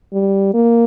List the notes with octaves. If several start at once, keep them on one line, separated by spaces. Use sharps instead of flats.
G3
A#3